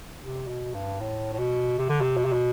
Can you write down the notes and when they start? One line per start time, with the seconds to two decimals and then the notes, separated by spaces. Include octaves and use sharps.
0.22 C3
0.48 B2
0.74 G2
1.00 A2
1.33 A2
1.38 B2
1.78 C3
1.89 D3
2.01 C3
2.17 B2
2.25 C3
2.33 B2